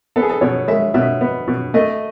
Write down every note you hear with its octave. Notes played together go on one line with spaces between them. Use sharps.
B3 A4
G#4
A4
B2 C#5
G#3 E5
B2 E5
B3
B2
A3 D#5